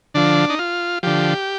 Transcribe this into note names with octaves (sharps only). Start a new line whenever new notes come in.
D3 F3 D4
D#4
F4
D3 F3 G4